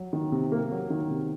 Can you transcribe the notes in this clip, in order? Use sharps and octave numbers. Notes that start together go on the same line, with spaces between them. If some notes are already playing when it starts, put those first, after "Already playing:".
Already playing: F#3
D#3
C3
A#3
F#3
D#3
C3